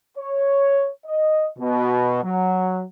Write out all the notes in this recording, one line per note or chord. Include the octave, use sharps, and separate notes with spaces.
C#5
D#5
B2
F#3